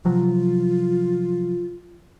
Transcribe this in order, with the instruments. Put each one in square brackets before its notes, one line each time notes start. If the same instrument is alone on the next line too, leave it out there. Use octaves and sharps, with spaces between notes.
[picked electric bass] C3 F3 F#3 [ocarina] F4